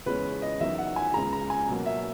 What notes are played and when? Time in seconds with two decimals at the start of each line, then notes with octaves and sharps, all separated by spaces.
0.06 E2 C#3 G#3 C#4 B4
0.42 D#5
0.60 E2 D#3 F#3 E5
0.79 F#5
0.96 G#5
1.14 C#2 C#3 G#3 A#5
1.33 A#5
1.50 G#5
1.68 B2 F#3 A#3
1.86 E5